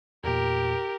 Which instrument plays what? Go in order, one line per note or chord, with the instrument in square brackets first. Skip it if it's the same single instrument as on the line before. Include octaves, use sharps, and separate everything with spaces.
[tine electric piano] E2 A#2 [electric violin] G4 A#4